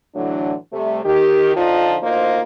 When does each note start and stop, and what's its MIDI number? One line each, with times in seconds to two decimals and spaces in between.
0.15 0.53 45
0.15 0.53 50
0.15 0.53 52
0.15 0.53 54
0.15 0.53 62
0.72 1.00 48
0.72 1.00 55
0.72 1.00 57
1.04 1.54 51
1.04 1.54 67
1.55 1.96 50
1.55 1.96 53
1.55 1.96 63
1.55 1.96 65
2.01 2.40 38
2.01 2.40 58
2.01 2.40 63
2.01 2.40 65
2.01 2.40 72